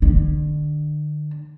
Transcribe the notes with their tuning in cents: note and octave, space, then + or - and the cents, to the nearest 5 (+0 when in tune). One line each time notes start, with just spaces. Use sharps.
D3 +35